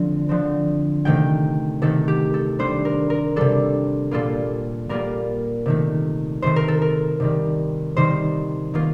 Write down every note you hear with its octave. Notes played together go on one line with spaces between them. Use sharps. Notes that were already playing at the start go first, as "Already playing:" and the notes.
Already playing: D3 F3 A3 C4
D3 F3 A3 C4
C3 D#3 A3 G5
C3 D#3 A3 A4
G4
A4
C3 G3 D4 C5
A#4
A#4
C3 G3 D4 A4
A#2 G3 A#3 F4 A4
A#2 G3 A#3 F4 A#4
C3 D#3 A3
C3 D#3 A3 C5
A#4
A4
A#4
C3 D#3 G3
C3 D#3 G3 C5
D#3 A#3 F4